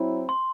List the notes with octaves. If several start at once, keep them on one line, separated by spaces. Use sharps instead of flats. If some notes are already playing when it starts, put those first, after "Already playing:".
Already playing: F#3 C4 E4
C6